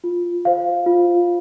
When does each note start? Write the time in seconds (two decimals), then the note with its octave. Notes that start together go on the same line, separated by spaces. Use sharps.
0.04 F4
0.45 C5 F5
0.86 F4